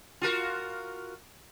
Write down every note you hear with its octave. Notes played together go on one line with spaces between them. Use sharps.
F4 F#4 A#4